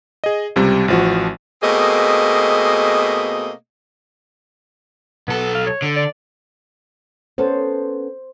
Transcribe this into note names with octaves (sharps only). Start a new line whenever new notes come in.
G#4 D#5
C#2 C3 G3
A1 F3 F#4
B2 A3 A#3 C4 G#4 D#5
B1 B3 A4
F5
C#5
D3
D5
B3 C#4 A4 C5